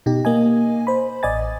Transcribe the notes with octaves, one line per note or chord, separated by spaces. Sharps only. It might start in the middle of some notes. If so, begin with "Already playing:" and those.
B2 D#4 G4
A#3 D#5 G#5
C5 B5
A1 D5 D#5 G#5 A6